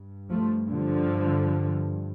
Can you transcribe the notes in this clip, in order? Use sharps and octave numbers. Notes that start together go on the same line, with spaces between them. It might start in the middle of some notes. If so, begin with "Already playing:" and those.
Already playing: G2
F3 A3
D3 F3